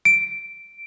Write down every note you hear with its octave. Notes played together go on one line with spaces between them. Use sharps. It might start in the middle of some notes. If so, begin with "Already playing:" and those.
D7